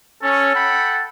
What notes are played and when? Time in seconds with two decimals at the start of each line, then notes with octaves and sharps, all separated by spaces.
0.23 C#4 A4
0.54 F#5 G5 B5